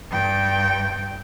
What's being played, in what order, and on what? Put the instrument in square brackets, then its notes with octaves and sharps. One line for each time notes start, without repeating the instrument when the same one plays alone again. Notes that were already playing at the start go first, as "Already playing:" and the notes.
[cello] G2 G5